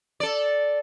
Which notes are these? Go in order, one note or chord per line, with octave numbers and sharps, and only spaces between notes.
A4 D5